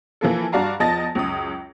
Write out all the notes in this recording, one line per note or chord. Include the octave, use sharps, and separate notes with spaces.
E3 F3 A#3 A4
G2 F#4 D5 F5 A5 A#5
E2 F3 D#5 A5 A6 A#6
C#2 F#2 D#6